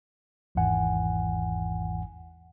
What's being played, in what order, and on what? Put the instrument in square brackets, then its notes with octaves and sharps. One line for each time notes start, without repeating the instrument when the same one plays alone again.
[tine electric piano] G#1 E2 G#2 E3 F#5 G#5